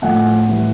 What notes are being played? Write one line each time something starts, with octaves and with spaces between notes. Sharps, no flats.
A2 F3 A3 F#5 G#5
A2 E3 G3